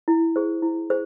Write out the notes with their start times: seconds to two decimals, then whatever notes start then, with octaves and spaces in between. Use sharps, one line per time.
0.08 E4
0.36 G#4 C5
0.62 E4
0.90 G#4 C5